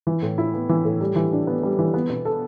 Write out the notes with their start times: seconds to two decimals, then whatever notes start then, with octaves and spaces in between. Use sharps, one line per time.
0.07 E3
0.22 A2
0.38 E4
0.54 B3
0.69 E3
0.85 A2
1.01 G3
1.16 E3
1.32 D4
1.47 B3
1.63 G3
1.79 E3
1.94 B3
2.10 B2
2.25 A4